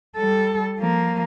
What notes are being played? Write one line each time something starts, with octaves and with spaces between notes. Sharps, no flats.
G3 A4
F3 A#3